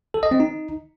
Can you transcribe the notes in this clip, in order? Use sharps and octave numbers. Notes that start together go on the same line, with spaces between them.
A4
D#5
C4
D#4